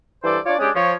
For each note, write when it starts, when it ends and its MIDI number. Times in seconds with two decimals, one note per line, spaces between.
0.24 0.39 43
0.24 0.39 52
0.24 0.39 69
0.24 0.39 72
0.24 0.39 74
0.46 0.55 62
0.46 0.55 65
0.46 0.55 73
0.46 0.55 74
0.59 0.70 56
0.59 0.70 61
0.59 0.70 62
0.59 0.70 67
0.59 0.70 68
0.75 0.94 53
0.75 0.94 73